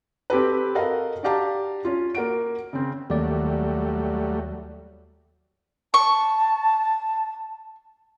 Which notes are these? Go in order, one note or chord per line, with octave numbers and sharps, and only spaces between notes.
C4 G4 A4 B4
F#4 A4 A#4 D#5 F5 F#5
D4 F#4 G4 F5 A5 A#5
C#4 F4
A#3 F#4 D7
C#3 C4
D#2 F#3 G3 A3 D5
A5 C#6